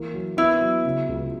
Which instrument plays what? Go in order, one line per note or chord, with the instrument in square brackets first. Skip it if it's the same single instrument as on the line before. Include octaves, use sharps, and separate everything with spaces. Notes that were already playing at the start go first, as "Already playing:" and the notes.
Already playing: [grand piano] E3 A#3
F#3
[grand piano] B3 [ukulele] E4
[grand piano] F#3
C#3
C#2